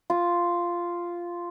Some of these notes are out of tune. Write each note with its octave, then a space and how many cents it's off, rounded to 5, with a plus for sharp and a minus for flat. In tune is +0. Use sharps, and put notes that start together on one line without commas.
F4 -5